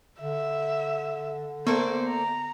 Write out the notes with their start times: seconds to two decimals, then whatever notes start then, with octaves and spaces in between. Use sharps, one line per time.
0.21 D3 E5
1.67 A#3 B3 A4 C5 D5
2.08 A#5